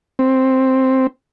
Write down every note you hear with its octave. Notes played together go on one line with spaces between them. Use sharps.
C4